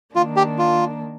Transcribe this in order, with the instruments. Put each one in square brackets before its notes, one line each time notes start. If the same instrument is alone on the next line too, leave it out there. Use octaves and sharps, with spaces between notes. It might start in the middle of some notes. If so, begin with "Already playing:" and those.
[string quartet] D#3 A#3 D4 [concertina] F4
[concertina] G4
F4